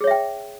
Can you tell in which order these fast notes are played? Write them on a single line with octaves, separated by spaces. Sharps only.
G#4 C#5 E5 G5